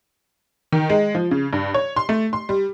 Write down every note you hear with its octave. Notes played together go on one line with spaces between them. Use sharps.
D#3
G#3
F3
C#3
G2
C#5
C6
A3
C6
G3